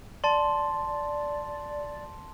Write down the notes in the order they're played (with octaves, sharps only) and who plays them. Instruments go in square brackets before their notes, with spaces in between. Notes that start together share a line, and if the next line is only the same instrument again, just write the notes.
[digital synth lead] D5 [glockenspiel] A5 C6